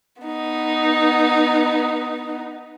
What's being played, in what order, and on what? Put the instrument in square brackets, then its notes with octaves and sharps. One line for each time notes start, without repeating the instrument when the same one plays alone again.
[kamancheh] B3 D#4